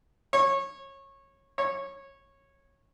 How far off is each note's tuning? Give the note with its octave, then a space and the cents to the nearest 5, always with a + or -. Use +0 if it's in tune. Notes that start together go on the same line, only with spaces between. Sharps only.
C#5 -20
C#5 -15